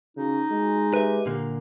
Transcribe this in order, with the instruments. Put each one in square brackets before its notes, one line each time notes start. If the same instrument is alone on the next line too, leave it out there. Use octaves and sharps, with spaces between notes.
[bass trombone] C#3 [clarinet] D#4 [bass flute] F#4
[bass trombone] G#3
[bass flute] G4 [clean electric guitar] B4 E5
[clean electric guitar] A#2 D3 A#3